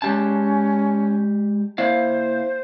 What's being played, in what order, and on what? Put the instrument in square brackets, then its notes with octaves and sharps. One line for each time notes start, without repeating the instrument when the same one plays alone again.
[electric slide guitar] G#3 G4 A5 [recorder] C#4
[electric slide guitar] A#3 E4 F5 [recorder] C5